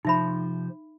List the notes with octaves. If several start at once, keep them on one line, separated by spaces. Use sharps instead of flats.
C3 F3 D#4 C5 E5 B5